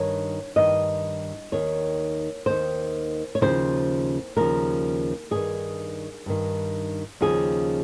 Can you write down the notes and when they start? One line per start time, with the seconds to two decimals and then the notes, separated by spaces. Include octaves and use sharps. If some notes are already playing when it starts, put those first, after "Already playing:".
Already playing: G2 D#3 C#5
0.56 G2 D#3 D#5
1.52 D#2 D#3 C#5
2.46 D#2 D#3 C5
3.35 C#5
3.41 D#2 C#3 F3 C5
4.36 D#2 C#3 F3 A#4
5.31 G2 D#3 G#4
6.26 G2 D#3
7.21 D#2 C#3 F3 G#4